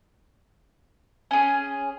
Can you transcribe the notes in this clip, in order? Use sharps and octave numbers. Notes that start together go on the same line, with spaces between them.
C#4 G#4